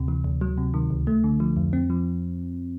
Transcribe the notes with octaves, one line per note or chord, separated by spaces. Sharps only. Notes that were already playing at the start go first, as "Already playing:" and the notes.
Already playing: D2 C3
E3
D2
F#3
C3
D#3
C#2
A3
D3
F3
F2
C4
F3